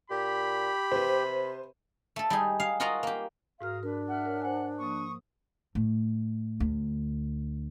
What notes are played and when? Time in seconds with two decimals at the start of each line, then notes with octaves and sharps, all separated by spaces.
0.10 A#2 G4 B5
0.92 C3 B4 C5
2.16 A3 A4
2.30 G3 D#4 G#4
2.60 G#4 F5
2.80 F4 F#4 A#4 D#5 F#5 A#5
3.03 A#3 G4
3.61 G#2 F#4 A#4 F5 D#6 F6
3.83 D4 A#4 B4
4.08 E5 F#5 F6
4.26 A#4 C#5
4.42 C5 F#5 G#5
4.79 F3 A#3 C#6 D#6
5.75 A2
6.60 D2